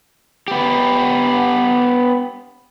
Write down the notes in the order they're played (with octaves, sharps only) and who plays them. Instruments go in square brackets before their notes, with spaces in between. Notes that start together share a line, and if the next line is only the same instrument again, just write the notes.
[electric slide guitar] B3 G4